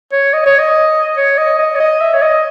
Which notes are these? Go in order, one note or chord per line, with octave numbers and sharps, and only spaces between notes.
C#5
D#5
C#5
D#5
C#5
D#5
D#5
C#5
D#5
E5
C#5
D#5